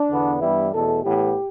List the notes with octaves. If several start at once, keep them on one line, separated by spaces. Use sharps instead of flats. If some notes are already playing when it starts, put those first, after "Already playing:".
Already playing: D4
E2 D3 B3
G2 E3 G3 B3 E4
E2 B2 A3 A4
A2 E3 B3 G4